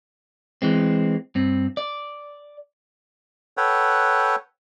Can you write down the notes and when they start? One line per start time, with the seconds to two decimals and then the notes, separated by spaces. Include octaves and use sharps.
0.62 E3 G#3 C4
1.35 G2 C4
1.77 D5
3.57 A4 B4 C#5 F#5 G5